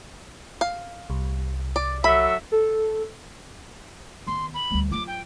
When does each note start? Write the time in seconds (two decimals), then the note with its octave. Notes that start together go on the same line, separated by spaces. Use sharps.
0.61 F5
1.10 C2
1.76 D5
2.04 F#3 A4 E5 B5
2.52 A4
4.27 D#3 B3 C6
4.54 B5
4.71 D2 G3
4.91 F#3 F4 D6
5.07 G5